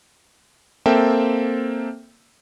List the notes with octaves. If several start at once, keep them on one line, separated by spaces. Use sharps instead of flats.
A#3 C4 A4 E5 G5 A5